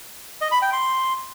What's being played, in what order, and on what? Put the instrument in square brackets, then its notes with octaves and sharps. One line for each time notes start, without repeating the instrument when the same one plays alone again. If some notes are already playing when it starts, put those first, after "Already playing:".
[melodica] D#5
B5
G5
C6